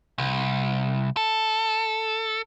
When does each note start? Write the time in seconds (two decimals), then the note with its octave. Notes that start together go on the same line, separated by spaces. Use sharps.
0.18 C2
1.17 A4